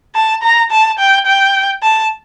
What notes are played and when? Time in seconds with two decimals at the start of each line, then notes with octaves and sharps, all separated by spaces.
0.15 A5
0.43 A#5
0.71 A5
0.99 G5
1.26 G5
1.83 A5